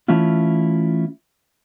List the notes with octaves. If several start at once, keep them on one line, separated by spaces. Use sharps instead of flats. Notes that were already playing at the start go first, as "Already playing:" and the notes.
E3 A3 C#4 E4 F4